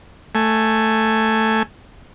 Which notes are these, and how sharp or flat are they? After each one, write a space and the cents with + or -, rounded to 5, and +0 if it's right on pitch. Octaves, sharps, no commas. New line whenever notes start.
A3 +5 G#5 +0